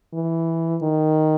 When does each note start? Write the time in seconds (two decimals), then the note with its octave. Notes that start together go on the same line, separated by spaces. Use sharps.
0.13 E3
0.82 D#3